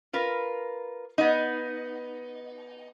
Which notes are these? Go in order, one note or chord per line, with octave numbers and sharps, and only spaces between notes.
F4 A#4 B4
B3 D#4